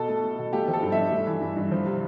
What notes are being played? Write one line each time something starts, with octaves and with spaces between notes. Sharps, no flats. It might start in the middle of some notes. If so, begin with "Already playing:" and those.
Already playing: B2 A4
A3
A3
B2
A3 G4
F3
A4
G2
E5
G2
A3
E3
G2
G2
F3
C3